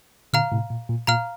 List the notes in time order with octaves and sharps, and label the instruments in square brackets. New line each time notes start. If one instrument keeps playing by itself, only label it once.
[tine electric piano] A#2 D3 [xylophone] F5 A#5 F6
[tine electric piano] A2 C3
A#2
A#2
[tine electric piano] A#2 [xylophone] F5 A#5 F6